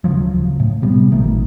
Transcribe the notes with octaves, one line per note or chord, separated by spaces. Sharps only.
D1 C#3 F3 F#3
A2
C3 G3 B3
A1 A#2 D#3 A3